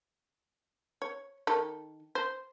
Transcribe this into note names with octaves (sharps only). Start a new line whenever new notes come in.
C#5
D#3 A4
C5